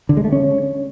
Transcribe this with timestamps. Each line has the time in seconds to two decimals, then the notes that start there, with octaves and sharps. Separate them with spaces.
0.09 D3
0.17 G#3
0.25 A3
0.32 C#4